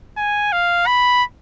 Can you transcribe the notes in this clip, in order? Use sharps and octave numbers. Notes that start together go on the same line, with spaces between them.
G#5
F5
B5